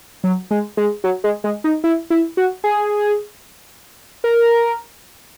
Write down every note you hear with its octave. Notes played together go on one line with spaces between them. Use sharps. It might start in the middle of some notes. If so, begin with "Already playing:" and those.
F#3
G#3
G#3
F#3
G#3
G#3
D#4
E4
E4
F#4
G#4
A#4